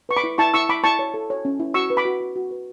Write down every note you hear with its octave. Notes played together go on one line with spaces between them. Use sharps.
B4 C#6
B5 D6
E4
E4 A5 C#6
E4 C#6 E6
E4 B5 D6
E4 A5 C#6
C#5
A4
C#5
C#4
E4
F#4 C#6 E6
B4
B5 D6
F#4
F#4
F#4
B4